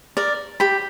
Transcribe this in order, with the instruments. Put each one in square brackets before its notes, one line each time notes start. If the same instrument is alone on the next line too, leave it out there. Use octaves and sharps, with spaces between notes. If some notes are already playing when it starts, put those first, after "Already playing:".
[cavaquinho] A#4 D5
G4 B5